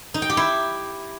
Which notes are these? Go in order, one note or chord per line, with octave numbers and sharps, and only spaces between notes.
D#4
G5
G4
E4